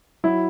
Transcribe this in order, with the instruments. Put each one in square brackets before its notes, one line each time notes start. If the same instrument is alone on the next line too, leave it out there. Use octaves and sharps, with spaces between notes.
[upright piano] F#3 E4